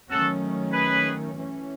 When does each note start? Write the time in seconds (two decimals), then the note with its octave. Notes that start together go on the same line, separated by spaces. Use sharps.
0.10 D#3 F#3 A3 C#4 F#4 A4
0.73 G#4 B4
1.36 E3 A3 C#4